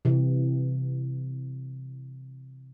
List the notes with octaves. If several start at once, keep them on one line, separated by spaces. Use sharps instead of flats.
C3 E3